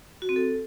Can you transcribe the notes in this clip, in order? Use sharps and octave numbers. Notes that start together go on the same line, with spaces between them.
F#4
C4
A4